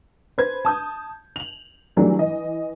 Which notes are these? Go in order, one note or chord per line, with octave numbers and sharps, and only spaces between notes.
B4 C5 G#6
A5 D#6 G6
F7 F#7
D#3 E3 F#3 G3 A3 D4
E3 D#5